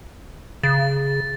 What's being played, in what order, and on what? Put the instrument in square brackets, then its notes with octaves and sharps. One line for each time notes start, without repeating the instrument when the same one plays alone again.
[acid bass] C#3 [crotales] A6